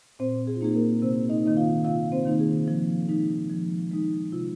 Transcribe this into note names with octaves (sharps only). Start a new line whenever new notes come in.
A#2 C4 C5
G#4
F4
A#3 D#4 G#4
A#3 A#4
C3 C4 C5
D#4 D#5
D#3 A#3 D#4 D#5
F4 F5
C3 F4 F5
C4 C5
D#3 A#3 D#4
G#4
F3
G#3 D#4
F3
G#3 D#4
C3 F4